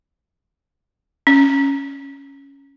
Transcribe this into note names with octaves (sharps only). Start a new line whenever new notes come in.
C#4